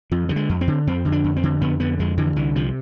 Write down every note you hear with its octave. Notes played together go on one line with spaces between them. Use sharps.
F2 F3
D3 F3
G#3
F2
C4
D3
F2 C4
D3
D4
F2
C4
D3
F2 B3
D3 B3
F2 G#3
D3 E3
C2 E3
C3 F3